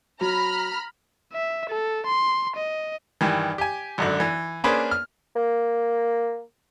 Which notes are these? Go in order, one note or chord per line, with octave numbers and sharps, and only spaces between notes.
F#3 A#5 B5 F6
E5
A4
C6
D#5
G2 D#3 E3
G4 G#5
G#1 F#2 D3
E3
A#3 C#4 D4 G#4 B4 C5
F6
A#3